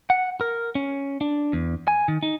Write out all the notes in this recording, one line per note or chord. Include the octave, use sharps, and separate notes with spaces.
F#5
A#4
C#4
D4
E2
G#5
D#3
D#4